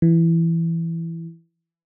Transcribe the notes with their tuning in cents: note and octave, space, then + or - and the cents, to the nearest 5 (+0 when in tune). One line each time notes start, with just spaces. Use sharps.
E3 +10